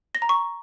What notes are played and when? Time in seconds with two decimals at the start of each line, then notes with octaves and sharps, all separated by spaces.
0.15 A#6
0.22 A#5
0.29 C#6